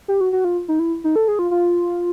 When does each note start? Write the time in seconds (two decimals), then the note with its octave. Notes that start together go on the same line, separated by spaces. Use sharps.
0.08 G4
0.21 F#4
0.33 F#4
0.44 F4
0.68 D#4
0.79 E4
1.04 D#4
1.16 A4
1.28 G#4
1.39 F4
1.51 F4